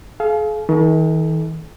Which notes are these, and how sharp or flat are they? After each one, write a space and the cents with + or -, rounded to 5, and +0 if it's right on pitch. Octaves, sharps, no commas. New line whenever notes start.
G#4 +45 F5 -10
D#3 +45 A4 -25